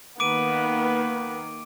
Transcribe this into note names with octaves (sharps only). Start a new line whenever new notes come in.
D#3 A#3 B3 B4 D6 D7 D#7